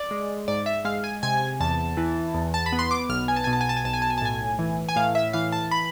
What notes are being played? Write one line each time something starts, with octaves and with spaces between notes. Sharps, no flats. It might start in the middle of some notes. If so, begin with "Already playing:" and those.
Already playing: D5
G#3
G#2 D5
E5
G#3 F5
G#5
C3 G#5
E2 A5
E3
E2
A5
B5
B3
C6
D6
B1 F6
G#5
A5
G#5
B2
A5
G#5
A5
G#5
B1 A5
G#5
A5
G#5
A5
A2 G#5
E3
G#5
A2 F5
E5
E3 F5
A5
B5